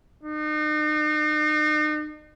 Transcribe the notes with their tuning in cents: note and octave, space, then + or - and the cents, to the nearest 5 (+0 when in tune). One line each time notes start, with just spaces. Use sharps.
D#4 -40